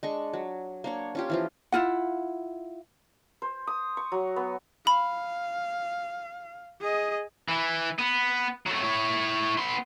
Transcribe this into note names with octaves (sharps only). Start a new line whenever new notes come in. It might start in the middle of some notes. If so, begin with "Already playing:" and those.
G#3 D4 C#6
F#3
A#3 D4 C#5
C#4 F4 G4
E3 F3 F4
E4 F4 F#5
C5
D#6
C#6
F#3
B3
F5 B5
G#4 D#5
E3
B3
F#3 A3
E4 C#5
B3 C6